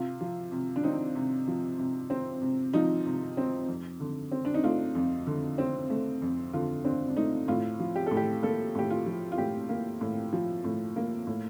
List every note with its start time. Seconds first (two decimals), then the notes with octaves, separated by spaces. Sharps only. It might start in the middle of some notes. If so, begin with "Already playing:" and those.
Already playing: C3 F4
0.21 F3
0.52 C3
0.76 D4
0.84 C4 D#4
1.15 C3
1.48 F3
1.78 C3
2.10 C4
2.42 C3
2.73 F3 D#4
3.06 C3
3.37 C4
3.68 F2
4.00 D3
4.32 C4
4.45 D4
4.54 D#4
4.63 A3 F4
4.95 F2
5.27 D3
5.58 C4
5.90 A3
6.22 F2
6.53 D3 F4
6.85 C4 D4
7.08 D4
7.16 A3 D#4
7.48 A2 F4
7.80 F3
7.96 G4
8.06 A2 A4
8.17 G4
8.43 A#3 A4
8.75 A2 G4
8.90 F4
9.06 F3
9.32 F4
9.38 A2 G4
9.69 A#3
10.01 A2
10.33 F3
10.64 A2
10.96 A#3
11.27 A2